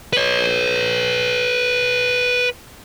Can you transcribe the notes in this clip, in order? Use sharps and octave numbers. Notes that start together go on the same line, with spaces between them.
B4 C#5